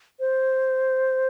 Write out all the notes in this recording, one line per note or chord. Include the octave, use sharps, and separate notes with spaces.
C5